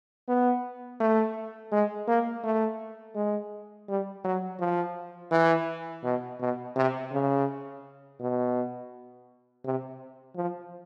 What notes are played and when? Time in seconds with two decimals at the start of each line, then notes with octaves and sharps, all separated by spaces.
0.28 B3
1.00 A3
1.72 G#3
2.08 A#3
2.44 A3
3.16 G#3
3.89 G3
4.24 F#3
4.60 F3
5.32 E3
6.04 B2
6.40 B2
6.76 C3
7.12 C#3
8.20 B2
9.65 C3
10.36 F3